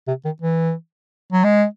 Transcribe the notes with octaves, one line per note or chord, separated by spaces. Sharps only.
C3
D#3
E3
F#3
G#3